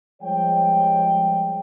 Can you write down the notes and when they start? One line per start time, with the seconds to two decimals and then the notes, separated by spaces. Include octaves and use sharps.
0.22 F3 G3 G#3 C5 C#5 G5